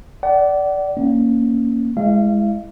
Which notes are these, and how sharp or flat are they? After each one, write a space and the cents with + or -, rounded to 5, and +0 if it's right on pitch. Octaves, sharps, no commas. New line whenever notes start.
D5 -10 F#5 +35
A#3 +0 C#4 +0
G#3 +0 E4 +0 F5 -35